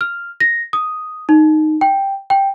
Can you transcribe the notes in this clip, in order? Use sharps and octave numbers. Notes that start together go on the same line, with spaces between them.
F6
A#6
D#6
D#4
G5
G5